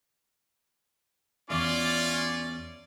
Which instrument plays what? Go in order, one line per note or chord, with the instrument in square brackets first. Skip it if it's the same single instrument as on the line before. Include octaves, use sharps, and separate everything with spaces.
[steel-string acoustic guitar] E2 E5 [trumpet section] C#4 D5 [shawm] F4